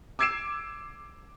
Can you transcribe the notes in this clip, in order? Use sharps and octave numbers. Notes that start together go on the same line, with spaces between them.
D6 E6 G#6 C7 D7 E7